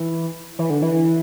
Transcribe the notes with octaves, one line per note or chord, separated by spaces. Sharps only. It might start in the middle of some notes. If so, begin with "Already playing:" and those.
Already playing: E3
E3
D3
E3